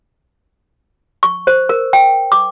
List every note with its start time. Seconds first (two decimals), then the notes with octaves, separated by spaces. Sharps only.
1.23 C#6
1.47 C5
1.69 A#4
1.93 G5
2.32 D6